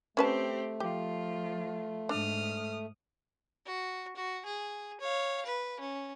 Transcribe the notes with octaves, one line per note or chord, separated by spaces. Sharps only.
A3 C4 C#4 G4 B4 A5
F3 F4 G4
G#2 D4 D#6 F6
F#4
F#4
G#4
C#5 F5
B4
C#4